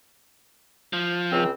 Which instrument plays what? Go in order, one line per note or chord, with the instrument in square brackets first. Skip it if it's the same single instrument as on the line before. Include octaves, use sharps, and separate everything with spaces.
[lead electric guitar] F3
[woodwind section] C#2 C4